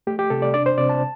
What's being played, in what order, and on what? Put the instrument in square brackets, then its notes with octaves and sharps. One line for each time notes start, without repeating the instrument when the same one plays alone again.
[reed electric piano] A3 G4
G4
C3 A4
D5
D4 D5
C5
C3 D5
A5